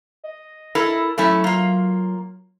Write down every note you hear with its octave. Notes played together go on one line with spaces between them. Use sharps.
D#5
E4 A4 A#4
F#3 A3 C#4 E4
A#3 F4